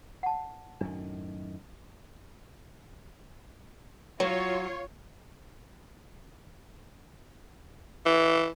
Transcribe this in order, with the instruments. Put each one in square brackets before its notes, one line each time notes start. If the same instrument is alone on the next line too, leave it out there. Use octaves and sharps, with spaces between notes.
[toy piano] F#5 A5
[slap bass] F#2 A2 D#3 [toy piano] D4
[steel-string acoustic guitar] F#3 [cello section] F4 C#5
[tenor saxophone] E3